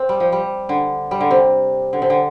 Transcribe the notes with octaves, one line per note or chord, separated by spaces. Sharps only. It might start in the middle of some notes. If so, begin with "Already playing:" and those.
Already playing: C4
G3
F3
G3
D3
G3
D3
C3
D3
C3
D3